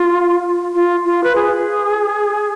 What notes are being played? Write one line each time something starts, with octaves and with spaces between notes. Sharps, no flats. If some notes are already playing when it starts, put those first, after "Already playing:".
Already playing: F4
F4
F4
B4
G#4